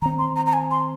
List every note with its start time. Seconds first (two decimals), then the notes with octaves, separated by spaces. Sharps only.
0.02 D#3 A#5
0.06 C4
0.19 C6
0.36 A#5
0.46 A#5
0.53 G#5
0.71 C6